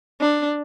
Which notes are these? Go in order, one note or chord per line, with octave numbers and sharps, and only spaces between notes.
D4